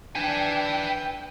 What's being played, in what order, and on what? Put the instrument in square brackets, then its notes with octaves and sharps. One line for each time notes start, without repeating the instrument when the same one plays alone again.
[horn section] D4 [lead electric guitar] B4 G#5 [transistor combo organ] G5